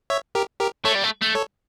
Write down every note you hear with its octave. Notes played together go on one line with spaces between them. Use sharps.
C#5 E5
G4 A#4
G4 A#4
A3 A4 C#5
G3
A3
A3
A4 C#5